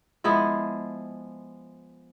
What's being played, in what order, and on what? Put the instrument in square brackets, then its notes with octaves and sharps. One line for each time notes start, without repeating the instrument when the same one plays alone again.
[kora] F3 G#3 B3 E4